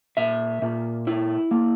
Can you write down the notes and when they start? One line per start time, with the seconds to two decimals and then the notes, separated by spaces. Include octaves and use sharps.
0.17 A#2 E5
0.62 A#2
1.07 E4
1.51 A#3